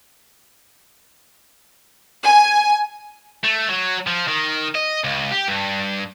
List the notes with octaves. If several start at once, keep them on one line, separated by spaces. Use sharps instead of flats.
G#5
A3
F#3
F3
D#3
D#5
C#2
G4
G2